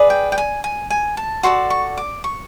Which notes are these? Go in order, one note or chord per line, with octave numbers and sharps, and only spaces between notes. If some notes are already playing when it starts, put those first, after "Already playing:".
Already playing: G#4 B4 D5
G5
G5
G#5
G#5
G#5
A5
F#4 A4 D5 C6
C#6
D6
C#6